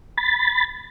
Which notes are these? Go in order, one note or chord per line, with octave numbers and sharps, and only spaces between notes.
B5 A6